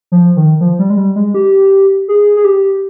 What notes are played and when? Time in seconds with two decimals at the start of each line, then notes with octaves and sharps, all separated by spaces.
0.12 F3
0.36 D#3
0.61 F3
0.79 G3
0.90 G#3
0.97 G3
1.16 G#3
1.34 G4
2.08 G#4
2.36 G#4
2.45 G4